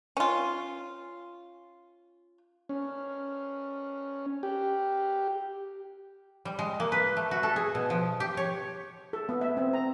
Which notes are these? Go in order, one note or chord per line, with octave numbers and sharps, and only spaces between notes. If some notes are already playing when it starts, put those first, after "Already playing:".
C#4 F4
C#4
G4
G3
G#3
A#3
B4
A3
F#4
A4
G#4
B2
F3
G4
C#5
A4
B3
E5
C4
A#5